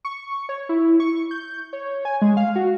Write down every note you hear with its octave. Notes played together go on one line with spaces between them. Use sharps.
C#6
C#5
E4
C#6
G6
C#5
G#5
G#3
F5
F#4